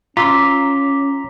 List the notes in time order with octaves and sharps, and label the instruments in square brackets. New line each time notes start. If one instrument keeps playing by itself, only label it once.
[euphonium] C#4 [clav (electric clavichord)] F4 [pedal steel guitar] A#5 C6 E6 [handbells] D6 B6